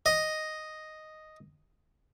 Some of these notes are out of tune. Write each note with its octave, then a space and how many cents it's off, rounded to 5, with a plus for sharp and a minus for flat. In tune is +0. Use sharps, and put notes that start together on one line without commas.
D#5 +0